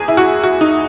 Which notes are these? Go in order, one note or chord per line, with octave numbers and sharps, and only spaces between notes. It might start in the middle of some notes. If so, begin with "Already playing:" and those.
Already playing: E2 G#4
E4
F#4
F#4
D#4